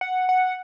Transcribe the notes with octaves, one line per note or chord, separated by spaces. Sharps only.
F#5
F#5